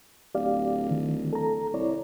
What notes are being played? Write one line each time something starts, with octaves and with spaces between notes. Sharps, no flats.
D1 G4 D5 F5
D#3
A4 A#5
C2 E4 C#5 D5